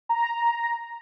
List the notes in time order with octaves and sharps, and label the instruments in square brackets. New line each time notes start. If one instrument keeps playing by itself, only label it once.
[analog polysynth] A#5